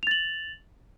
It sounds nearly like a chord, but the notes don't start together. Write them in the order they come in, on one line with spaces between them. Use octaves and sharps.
F7 A6 F#7